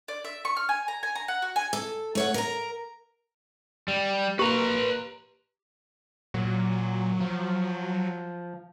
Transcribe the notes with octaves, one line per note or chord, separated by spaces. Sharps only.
D5
E5
C#6
F6
G#5
A#5
G#5
A#5
F#5
F#4
G#5
A4
A3 C#5 F#5
A#4 A#5
G3
A#3 G4 B4 A#5
A#2 F#3
F3